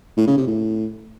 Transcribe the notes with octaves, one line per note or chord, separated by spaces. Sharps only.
A2
C#3
C3
A2